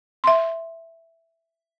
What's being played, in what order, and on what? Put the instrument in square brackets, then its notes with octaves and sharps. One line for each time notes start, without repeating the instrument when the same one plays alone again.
[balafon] E5 C6